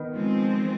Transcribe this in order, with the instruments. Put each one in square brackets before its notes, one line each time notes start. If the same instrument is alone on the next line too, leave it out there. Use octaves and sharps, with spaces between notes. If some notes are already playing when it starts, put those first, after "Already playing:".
Already playing: [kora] D#3 B3
[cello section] F3 G#3 C4